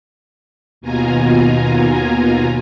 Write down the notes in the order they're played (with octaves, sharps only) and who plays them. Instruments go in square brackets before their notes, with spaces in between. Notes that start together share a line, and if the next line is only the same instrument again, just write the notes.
[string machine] D#2 B2 F4 G#5 A#5